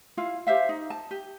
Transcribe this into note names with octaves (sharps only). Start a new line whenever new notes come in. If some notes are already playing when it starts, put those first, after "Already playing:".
E4 F4 F5
G4 C5 E5 F5
D#4
A5
G4